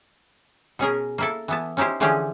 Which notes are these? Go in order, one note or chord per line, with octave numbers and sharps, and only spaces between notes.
B2 C#4 G#4 A#4
A#3 E4 A4
E3 B3 A5
C#4 D#4 E4 G4 C5
D3 E3 F3 C#4 G4 G#4